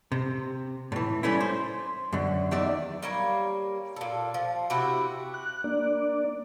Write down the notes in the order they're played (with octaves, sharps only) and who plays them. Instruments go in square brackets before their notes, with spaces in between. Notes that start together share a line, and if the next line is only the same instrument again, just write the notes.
[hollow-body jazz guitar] C3
A2 E3
G3 A3 C#4 E4
C5
F#2 D3
E2 D#3 D5 E5
[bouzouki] G3 A#3 C#5
A#2 A4
F3
C3 E4 F#4 G4
[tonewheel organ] F#6
A#3 D4 D5